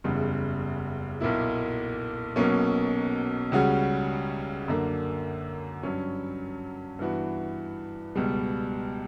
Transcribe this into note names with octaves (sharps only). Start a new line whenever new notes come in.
F#1 E2 C#3 G3
B1 A#2 A#3 E4
B1 B2 F#3 A#3 C#4
C#2 C#3 G3 C#4 F#4
F#2 D3 A#3
G2 F#3 C#4
G2 E3 B3 F#4
C#2 B2 G3